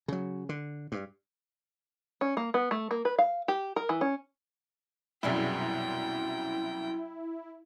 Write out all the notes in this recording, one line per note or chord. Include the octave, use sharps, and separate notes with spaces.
C#3 F#3
D3
G2
C#4
A#3
B3
A3
A#3
B4
F5
G4
A#4
E3
C#4
C2 F#2 B2 D4 E4 G#4 G5